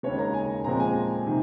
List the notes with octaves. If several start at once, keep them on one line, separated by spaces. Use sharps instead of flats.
D#2 C#3 G#3 C#5
A#5
G#5
A#2 F3 G#3 C4 A#5
G#5
C3 D#3